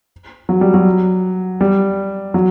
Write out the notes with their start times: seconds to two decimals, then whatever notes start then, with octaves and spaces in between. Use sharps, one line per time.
0.49 F#3
0.61 G3
0.74 F#3
1.61 G3
2.34 F#3